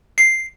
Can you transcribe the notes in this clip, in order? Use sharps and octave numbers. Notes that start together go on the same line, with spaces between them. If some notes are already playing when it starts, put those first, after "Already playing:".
C7